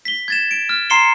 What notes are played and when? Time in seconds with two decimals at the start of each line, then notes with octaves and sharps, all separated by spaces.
0.05 B6 G7
0.28 G#6 A6 E7
0.51 D7
0.69 F6
0.90 A#5 C6 C7 C#7 E7 G7